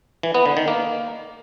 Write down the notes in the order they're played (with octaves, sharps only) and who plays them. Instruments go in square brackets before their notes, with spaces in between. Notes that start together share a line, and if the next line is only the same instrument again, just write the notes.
[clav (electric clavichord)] E3
B3
D3
D#3
A#3